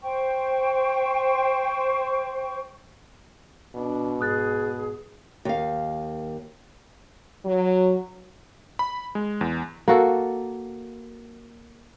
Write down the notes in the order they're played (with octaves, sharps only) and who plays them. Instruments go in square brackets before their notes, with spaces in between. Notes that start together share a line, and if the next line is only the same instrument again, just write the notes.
[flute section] C5 G5 C#6
[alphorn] B2 [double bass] D4
[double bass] G#2 [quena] G#4 [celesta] D#6 F#6 A6
[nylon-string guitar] D#2 F5
[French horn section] F#3
[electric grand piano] B5
G#3
E2
[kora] A#3 F#4 A4